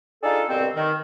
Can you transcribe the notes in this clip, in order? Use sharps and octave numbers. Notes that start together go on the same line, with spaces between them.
D4 D#4 F4 G#4 A4
C2 G2 B2 D3 C4
D#3